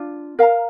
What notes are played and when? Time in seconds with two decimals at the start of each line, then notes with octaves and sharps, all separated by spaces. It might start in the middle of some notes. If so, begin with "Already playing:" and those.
Already playing: D4 F4
0.39 A#4 F5 A#5